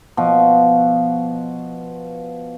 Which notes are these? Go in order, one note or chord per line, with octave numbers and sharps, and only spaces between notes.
B2 F3